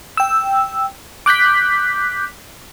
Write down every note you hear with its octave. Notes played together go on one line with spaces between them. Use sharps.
G5 E6
D6 F#6 G6 B6